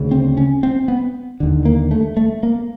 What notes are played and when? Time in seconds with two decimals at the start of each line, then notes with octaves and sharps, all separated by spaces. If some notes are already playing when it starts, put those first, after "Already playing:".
Already playing: D2 C#3
0.11 C4
0.37 C#4
0.63 C4
0.88 B3
1.40 D#2 D3
1.65 A#3
1.91 A3
2.17 A3
2.43 A#3